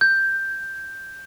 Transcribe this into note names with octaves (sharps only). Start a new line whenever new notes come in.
G6